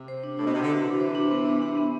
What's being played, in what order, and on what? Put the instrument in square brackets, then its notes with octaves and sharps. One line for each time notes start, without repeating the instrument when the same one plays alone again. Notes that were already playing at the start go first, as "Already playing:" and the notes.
Already playing: [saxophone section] C3
[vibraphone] C5
D4
[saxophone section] A2 [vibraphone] D4
[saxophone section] B2
[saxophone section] C3 [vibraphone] D4
[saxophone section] D3
[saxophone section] C3 E3 [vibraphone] F#4
[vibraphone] D4
C5
D4
B3
D4
D4
B3